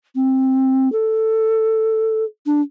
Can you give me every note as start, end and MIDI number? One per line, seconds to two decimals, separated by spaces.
0.15 0.91 60
0.92 2.24 69
2.46 2.61 62